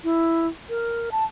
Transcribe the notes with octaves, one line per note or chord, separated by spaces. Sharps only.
E4
A#4
A5